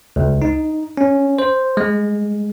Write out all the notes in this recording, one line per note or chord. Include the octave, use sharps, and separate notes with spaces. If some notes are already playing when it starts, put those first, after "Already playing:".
C#2
D#4
C#4
C5
G#3